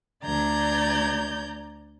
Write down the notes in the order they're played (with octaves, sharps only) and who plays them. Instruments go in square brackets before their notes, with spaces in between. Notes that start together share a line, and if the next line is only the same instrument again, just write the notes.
[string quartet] D2 D5 A#5 G6 G#6